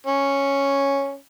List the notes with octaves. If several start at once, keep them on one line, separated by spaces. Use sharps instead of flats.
C#4